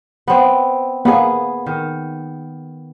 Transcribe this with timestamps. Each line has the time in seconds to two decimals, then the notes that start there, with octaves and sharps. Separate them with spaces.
0.28 B3 C4
1.05 A#3 B3 G#4
1.66 D#3